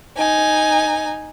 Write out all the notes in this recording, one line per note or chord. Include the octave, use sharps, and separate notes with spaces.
D#4 G#5